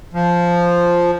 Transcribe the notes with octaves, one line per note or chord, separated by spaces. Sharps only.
F3